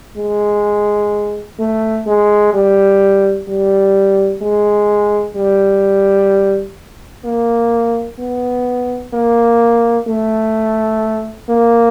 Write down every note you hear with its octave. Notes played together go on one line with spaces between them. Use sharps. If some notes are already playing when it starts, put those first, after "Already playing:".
G#3
A3
G#3
G3
G3
G#3
G3
A#3
B3
A#3
A3
A#3